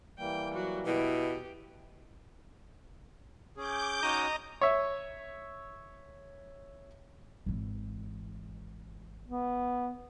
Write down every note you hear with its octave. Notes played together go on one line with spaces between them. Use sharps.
E3 G3 A#3 G5
F#3 F#4
B2 E4 G4
C#4 G#4 D6 G6
C#4 D#4 F#4 D#5 A#5
C#5 E5
G#1 E3
B3